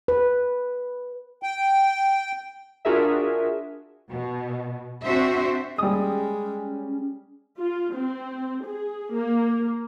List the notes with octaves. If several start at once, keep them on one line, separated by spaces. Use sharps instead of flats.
B4
G5
D4 F4 F#4 G#4 A#4 E5
B2
C4 D4 F#4 C5 E5
G3 G#3 C#4 D#6
F4
C4
G#4
A#3